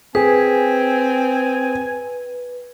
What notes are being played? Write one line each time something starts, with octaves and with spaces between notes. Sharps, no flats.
C4 G#4 B4 G#5